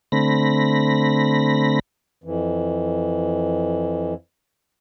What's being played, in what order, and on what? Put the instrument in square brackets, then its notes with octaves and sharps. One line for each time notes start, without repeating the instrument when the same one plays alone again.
[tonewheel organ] D3 A3 C4 B5 A#6
[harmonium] F2 E3